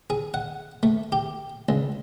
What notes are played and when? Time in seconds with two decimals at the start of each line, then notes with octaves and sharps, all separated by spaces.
0.10 G#4
0.34 F#5
0.83 A3
1.12 G4
1.69 C#2